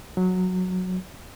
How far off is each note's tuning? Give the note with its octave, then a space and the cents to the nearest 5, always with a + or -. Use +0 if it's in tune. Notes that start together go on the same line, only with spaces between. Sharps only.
F#3 -10